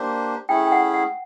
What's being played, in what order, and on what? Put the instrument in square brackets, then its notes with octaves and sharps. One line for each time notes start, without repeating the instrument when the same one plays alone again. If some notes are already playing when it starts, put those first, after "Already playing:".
Already playing: [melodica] A#3 D4 G4 C5
[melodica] A3 C#4 E4 G#4 [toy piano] G5
[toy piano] G5
F#5
F#5